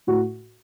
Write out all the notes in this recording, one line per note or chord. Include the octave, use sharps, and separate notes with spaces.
A2 F#4